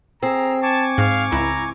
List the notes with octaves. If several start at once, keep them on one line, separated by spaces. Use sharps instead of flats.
C4 G#4 A#5 E6
G#5 A5 C#6 D6
G#2 F5
C#2 E4 A#5